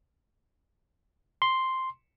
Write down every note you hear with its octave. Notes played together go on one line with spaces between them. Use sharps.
C6